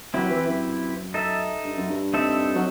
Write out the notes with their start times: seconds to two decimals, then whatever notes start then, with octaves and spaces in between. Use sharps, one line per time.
0.14 F#3 C4 E4 G4 B4
0.31 E3
0.47 F#2
1.14 D#4 A4 E5
1.64 G2
1.77 F#2
1.89 G2
2.14 C4 D#4 A4 E5
2.55 F#3